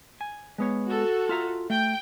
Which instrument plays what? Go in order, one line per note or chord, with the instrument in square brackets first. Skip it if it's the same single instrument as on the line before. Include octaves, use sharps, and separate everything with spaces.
[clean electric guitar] G#5
G#3 B3 C#5
[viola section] F#4 A4
[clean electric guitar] F4 E5 A#5
[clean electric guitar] A3 [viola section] G5